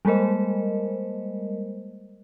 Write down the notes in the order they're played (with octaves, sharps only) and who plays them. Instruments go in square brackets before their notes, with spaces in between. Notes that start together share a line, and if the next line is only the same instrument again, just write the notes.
[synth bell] G3 G#3 A#3 A#4 C5 D#5